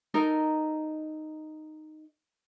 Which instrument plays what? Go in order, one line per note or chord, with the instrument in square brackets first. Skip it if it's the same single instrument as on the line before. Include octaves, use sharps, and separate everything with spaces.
[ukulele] D#4 A4 A#4 D#5